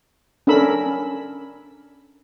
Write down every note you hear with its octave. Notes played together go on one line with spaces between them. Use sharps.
C#4 D4 A4 A#4 B5 E6